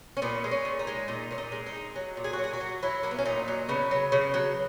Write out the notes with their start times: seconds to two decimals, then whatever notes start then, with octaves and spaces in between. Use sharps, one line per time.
0.17 C#4
0.22 A#2 B3
0.44 G#3
0.51 C#4
0.65 A#2
0.79 D#4
0.87 G#3
1.08 A#2 D#4
1.31 A#2 C#4
1.38 D#4
1.52 G#3
1.66 D#4
1.74 G#3
1.96 F#3
2.17 A#2
2.24 G#4
2.33 F#4
2.39 F#3
2.44 G#4
2.53 F#4
2.60 F#3
2.83 F#3 E4
3.03 F#3 A#3
3.11 B3
3.19 C#4
3.25 A#2 D#4
3.48 F#3
3.69 C#3 B3
3.91 F#3
4.12 C#3
4.34 F#3